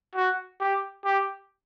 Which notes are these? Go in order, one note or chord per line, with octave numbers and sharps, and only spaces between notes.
F#4
G4
G4